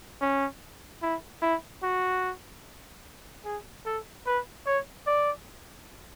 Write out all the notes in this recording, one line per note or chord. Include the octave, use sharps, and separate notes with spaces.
C#4
E4
E4
F#4
G#4
A4
B4
C#5
D5